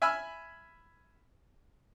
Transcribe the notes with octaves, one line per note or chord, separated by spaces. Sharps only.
E5 G#5 B5 E6 F6